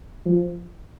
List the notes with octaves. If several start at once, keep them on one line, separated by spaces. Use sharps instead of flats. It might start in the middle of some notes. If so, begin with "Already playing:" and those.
F3